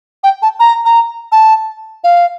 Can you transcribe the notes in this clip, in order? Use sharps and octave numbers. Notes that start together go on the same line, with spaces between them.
G5
A5
A#5
A#5
A5
F5